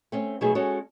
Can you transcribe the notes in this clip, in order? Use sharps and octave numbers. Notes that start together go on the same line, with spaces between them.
A3 C4 C#4
B2 F#3 A3 B3 D#4 G#4
G#3 C#4 F#4 A4 C#5